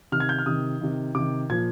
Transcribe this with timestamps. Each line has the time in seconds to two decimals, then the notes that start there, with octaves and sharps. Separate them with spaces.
0.12 C3 D#3 F6
0.20 G#6
0.29 G6
0.39 F6
0.46 C3 D#3 D#6
0.81 C3 D#3
1.15 C3 D#3 D6
1.49 A#2 F3 G#6